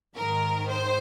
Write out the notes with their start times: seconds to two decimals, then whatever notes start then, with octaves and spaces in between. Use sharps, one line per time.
0.15 G#2 D#3 A#4
0.69 C5